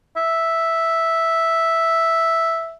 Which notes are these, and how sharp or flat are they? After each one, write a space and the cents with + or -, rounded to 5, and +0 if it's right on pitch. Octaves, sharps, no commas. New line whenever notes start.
E5 -5